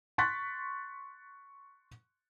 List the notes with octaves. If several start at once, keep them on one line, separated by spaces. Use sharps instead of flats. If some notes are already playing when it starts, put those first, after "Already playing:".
C6 C#6 F#6 A6 B6